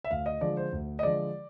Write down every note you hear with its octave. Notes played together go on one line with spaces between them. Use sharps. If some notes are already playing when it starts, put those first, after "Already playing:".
E5
D2 F5
D#5
D3 F3 G#3 D5
C5
D2
D#5
D3 F3 G#3 D5